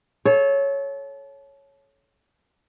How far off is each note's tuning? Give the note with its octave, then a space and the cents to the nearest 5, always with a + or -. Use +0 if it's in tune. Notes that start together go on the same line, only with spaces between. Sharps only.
A4 -30 C#5 +0